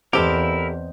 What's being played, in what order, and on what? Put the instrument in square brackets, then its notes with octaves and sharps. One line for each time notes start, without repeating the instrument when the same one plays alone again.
[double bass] E2 [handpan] C4 C5 D#5 [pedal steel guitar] E4 A#4 [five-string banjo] G4 A4